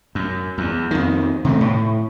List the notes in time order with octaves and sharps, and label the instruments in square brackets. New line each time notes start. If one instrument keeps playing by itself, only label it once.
[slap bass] F#2
E2
F2 D#3
C3 D#3 A3
A2